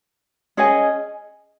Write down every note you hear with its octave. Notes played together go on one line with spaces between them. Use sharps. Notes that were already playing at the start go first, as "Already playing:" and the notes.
C#4 G#4 D#5 G#5